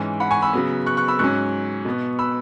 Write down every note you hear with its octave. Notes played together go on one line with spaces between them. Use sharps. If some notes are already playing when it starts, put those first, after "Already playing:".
Already playing: G#2 E3 C#4
F#5 B5
G#5 C#6
B5 E6
C#3 F#3 B3
C#6 F#6
C#6 F#6
B5 E6
G#2 F#3 C#4 C#6 F#6
B2 B3
B5 E6